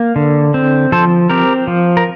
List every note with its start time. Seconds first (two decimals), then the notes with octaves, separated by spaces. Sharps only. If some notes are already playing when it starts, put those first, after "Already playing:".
Already playing: A#3
0.16 D3
0.54 C4
0.92 F3 A4 C5
1.30 C4 G4 A#4
1.67 F3
1.97 A#4